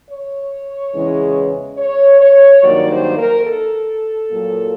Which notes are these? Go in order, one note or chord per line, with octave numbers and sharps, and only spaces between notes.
C#5
E2 C#3 E3 G#3
C#5
C#5
G2 D#3 F#3 A#3 D5
C5
A#4
A4
A#2 F#3 A#3